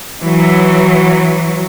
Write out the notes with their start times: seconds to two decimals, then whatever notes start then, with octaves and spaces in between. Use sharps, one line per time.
0.22 E3 F#3